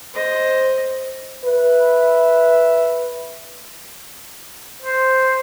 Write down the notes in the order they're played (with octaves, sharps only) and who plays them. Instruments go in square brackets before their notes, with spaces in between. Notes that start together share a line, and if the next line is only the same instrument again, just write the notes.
[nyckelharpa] C5 D#5
[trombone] B4 [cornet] E5
[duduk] C5